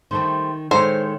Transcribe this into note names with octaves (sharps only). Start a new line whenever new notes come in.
D#3 G3 A3 C5
D#3 G#3 E4 A4 C5 C#5